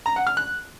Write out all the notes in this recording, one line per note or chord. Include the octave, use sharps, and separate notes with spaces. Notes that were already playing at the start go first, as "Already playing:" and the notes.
A#5
F#5
F6
F#6